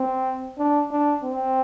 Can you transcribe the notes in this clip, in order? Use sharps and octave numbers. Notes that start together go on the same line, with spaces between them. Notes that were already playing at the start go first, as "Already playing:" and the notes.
Already playing: C4
D4
D4
C4